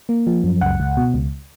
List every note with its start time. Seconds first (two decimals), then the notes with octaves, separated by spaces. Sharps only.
0.09 A#3
0.27 F3
0.44 F#2
0.61 C#2 F#5
0.80 C#2
0.97 B2
1.14 C#2